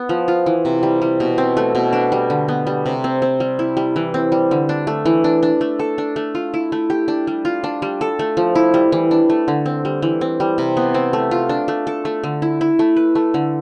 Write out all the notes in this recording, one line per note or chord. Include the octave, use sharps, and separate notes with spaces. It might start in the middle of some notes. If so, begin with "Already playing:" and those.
Already playing: B3
F3
F4
E3
C3
G3
G3
B2
C4
A3
B2
D4
G3
D3
B3
G3
C3
C4
C4
G3
E4
G3
E3
C4
G3
D3
D4
A3
E3
D4
D4
A3
A4
D4
A3
F4
E4
A3
G4
D4
G3
F4
D4
G3
A4
A3
F3
E4
G3
E3
D4
A3
D3
C4
G3
E3
C4
G3
C3
B3
C4
A3
F4
D4
A3
A4
A3
D3
E4
E4
A3
B4
A3
D3